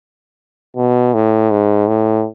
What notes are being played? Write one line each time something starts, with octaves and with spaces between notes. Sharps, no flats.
B2
A2
G#2
A2